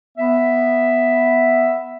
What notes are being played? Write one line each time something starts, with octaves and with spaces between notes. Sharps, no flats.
B3 E5